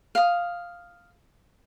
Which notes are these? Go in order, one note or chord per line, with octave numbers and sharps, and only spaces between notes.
F5 D#6